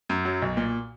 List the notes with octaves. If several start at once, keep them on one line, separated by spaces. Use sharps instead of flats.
F#2
F#3
B1
A#2